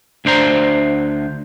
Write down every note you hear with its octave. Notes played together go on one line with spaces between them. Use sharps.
D2 D4 C5 A#5